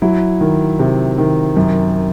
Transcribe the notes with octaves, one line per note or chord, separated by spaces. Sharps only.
F#3 E4
D#3
C3
D#3
F#2